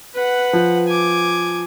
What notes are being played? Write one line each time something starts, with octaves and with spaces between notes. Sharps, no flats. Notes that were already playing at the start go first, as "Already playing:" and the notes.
B4 F#5
F3
G#5 D6